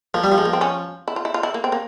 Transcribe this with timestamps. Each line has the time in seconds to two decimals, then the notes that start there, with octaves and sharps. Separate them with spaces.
0.14 F3 A#3
0.24 G3
0.32 F3
0.38 G#3
0.45 A#3
0.53 C4
0.61 C#4
1.08 E4
1.16 F4
1.25 E4
1.34 F4
1.43 E4
1.54 A#3
1.64 C4
1.72 A#3